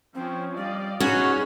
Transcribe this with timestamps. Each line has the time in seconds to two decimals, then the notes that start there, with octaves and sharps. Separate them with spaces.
0.15 F3 C4 C#4
0.57 G3 D5 D#5 F5
1.00 C#4 D#4 F#4 G#4 B4